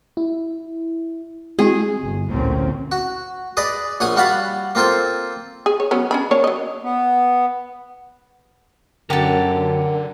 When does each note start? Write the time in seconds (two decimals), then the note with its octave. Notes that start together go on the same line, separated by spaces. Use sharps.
0.17 E4
1.59 G#3 C4 E4 F#4 G#4
2.01 G1
2.31 A1 D2 A#2 A#3 C4 C#4
2.92 F#4
3.57 G#4 B4 D5 D#5
4.00 A#1 C#5 F#5 G#5 D#6
4.16 G3 F#4 F5 F#5 A5 B5
4.75 A#3 C4 F4 A4 C5
5.66 G#4
5.80 C#5
5.91 F#3 B3 C#4
6.11 C#4 D4 B5
6.31 A#3 D4 C#5
6.44 F#3 D#5
6.83 B3
9.10 F#2 D3 G4 A4 A#4 F#5